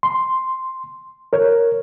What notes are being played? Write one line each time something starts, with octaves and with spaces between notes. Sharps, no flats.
C6
A#4 C#5